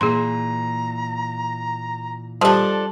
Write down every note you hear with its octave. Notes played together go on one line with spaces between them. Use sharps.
A#2 E3 G#4 A#5 C6
F3 G3 D4 G4 A4